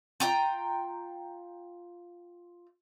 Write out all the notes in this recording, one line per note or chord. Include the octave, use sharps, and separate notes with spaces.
F4 G5 A#5